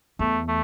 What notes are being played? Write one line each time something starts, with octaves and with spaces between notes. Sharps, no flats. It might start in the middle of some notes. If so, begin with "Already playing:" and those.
E2 A3
A3